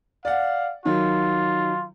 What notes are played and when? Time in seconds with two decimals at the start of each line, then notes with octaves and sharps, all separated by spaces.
0.25 D5 F5 F#5
0.85 D#3 F#3 F4